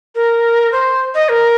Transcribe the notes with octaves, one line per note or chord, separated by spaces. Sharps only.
A#4
C5
D#5
A#4